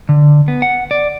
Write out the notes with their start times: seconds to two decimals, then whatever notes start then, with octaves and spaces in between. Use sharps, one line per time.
0.09 D3
0.48 B3
0.62 F#5
0.91 D5